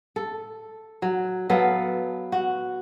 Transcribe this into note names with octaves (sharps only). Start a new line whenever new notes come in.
A4
F#3
F#3 B3 A4 F5
F#4